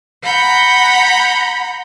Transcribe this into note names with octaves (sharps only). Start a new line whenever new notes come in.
F#5 A#5 B5 G6